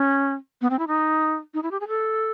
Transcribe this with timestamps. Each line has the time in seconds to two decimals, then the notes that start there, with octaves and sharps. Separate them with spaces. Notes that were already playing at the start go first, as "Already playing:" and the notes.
Already playing: C#4
0.61 B3
0.70 C4
0.79 E4
0.88 D#4
1.54 D#4
1.63 E4
1.71 G4
1.80 G#4
1.88 A4